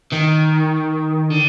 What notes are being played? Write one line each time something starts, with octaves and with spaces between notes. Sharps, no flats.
D#3
D3